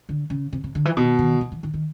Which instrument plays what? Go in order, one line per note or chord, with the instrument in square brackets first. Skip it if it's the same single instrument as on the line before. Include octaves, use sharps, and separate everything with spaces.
[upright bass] D3
C#3
C3
C3
D3
E3
[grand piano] B2 [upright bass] D#3
[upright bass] D#3
E3
E3
D#3
D#3